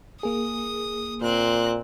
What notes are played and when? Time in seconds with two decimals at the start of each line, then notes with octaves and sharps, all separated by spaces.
0.23 A#3 G#4 D#6
1.22 A#2 C4 F#6